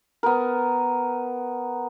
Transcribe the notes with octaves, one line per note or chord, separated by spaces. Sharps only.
B3 A#4